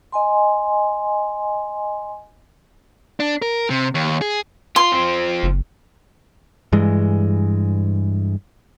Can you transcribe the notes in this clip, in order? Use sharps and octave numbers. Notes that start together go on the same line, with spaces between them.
D#5 G#5 C6
D4
A#4
C3
D#2
G#4
F4 C6
F3 C4
F#1
G2 E3 G#3